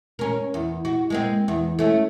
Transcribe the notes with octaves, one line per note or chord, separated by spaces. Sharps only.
C#4 A#4
E2
F#4
G#3 A#3 C4
E2
A3 C#4